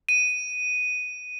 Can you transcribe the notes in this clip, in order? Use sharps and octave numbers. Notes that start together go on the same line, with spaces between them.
D#7